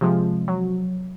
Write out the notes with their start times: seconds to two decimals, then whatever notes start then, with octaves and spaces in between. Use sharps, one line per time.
0.01 C3 F3 G#3
0.48 F#3